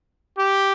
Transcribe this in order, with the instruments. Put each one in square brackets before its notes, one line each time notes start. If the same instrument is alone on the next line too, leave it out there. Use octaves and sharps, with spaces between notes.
[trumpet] G4